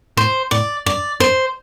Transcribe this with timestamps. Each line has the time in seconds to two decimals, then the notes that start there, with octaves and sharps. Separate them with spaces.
0.17 A2 C5
0.51 A2 D5
0.86 G2 D5
1.20 G2 C5